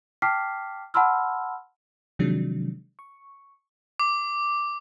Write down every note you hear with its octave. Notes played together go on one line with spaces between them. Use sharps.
G5 A5 D6 F6 B6 C7
F#5 A5 B5 C6 E6 F6
C3 D#3 F3 F#3 G#3 D4
C#6
D6